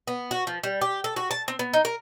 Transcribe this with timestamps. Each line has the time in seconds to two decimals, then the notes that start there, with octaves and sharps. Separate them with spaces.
0.08 B3
0.31 F#4
0.47 F3
0.63 G3
0.81 G4
1.04 A4
1.16 F#4
1.31 A5
1.48 C4
1.59 B3
1.73 D#4
1.85 A#4